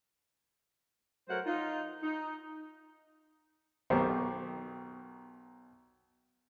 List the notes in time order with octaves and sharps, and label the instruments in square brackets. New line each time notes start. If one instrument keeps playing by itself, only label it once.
[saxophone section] F#3 A3 A#4 C5 F#5
D#4 F4
D#4
[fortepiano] B1 B2 D#3 G4 C5 C#6